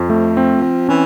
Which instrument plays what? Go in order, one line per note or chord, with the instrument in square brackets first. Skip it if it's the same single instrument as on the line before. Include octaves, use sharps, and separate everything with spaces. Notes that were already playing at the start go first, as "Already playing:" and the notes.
Already playing: [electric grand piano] F2 [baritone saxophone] F3
[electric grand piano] A3
C4
C4
[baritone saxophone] E3 [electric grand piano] C#4